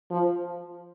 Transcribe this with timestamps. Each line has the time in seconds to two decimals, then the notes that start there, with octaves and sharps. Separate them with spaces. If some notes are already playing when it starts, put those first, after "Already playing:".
0.11 F3